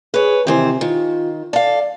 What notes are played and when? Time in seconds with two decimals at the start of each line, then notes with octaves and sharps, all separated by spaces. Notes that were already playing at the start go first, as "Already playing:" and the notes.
0.14 G#4 B4 C#5
0.47 C3 D#3 E3 C5
0.81 D#3 F4
1.53 A4 D5 F5